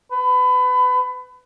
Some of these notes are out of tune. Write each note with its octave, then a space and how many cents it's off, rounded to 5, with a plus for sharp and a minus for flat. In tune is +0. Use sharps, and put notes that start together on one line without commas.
B4 +25